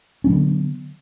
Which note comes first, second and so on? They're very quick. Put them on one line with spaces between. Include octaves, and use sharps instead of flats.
C#4 F#3 D3 B3